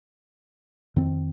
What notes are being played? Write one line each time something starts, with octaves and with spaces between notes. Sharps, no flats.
F2 D#3 C4